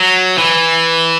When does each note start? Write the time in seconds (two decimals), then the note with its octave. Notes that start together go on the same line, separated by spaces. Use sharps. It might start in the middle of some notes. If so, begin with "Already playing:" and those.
Already playing: F#3
0.38 E3